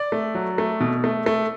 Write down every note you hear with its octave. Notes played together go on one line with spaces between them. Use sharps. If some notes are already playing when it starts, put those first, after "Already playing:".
Already playing: D5
A3
F#3
A3
B2
A3
A3